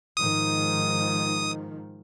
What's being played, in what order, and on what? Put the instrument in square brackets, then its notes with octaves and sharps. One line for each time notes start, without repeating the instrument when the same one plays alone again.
[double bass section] G#2 D#3 F3 [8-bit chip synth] D#6